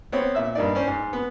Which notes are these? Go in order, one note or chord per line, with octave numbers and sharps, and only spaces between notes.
B3 C4 C#5
A#2 E5 E6
G2 A#3 D#4 D5
C#4 C5 D5
G#2
B3